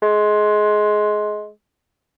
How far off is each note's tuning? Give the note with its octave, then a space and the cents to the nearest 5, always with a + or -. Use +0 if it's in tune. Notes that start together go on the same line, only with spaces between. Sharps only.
G#3 +20